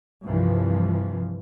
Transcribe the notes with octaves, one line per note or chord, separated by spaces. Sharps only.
C2 G2 C3 E3 F3